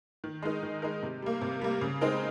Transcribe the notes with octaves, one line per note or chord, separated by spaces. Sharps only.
D#3
G#3 D#4 A#4
D#3
G#3 D#4 A#4
C3
G3 A#3
C3
G3 A#3
C#3
G#3 C4 D#4 A#4